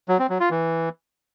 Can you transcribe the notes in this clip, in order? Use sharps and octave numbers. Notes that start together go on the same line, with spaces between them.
F#3
C4
F#3
F4
E3